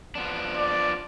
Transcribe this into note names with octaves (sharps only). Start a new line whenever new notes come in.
F3 B3 D4
D5